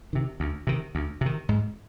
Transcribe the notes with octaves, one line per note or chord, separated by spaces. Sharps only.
C3 D#3
D2
C3 D#3
D2
C3 D#3
G#2